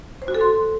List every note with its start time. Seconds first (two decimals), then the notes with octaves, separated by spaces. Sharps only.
0.22 C5
0.28 F#4
0.34 A4
0.41 C6